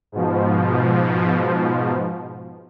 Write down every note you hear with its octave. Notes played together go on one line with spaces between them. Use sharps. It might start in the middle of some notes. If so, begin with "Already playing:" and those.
G#2 B2 F3